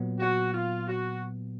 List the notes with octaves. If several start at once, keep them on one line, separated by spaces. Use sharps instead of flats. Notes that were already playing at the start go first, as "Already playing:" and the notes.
Already playing: A#2 F#3 B3
F#4
F4
F#4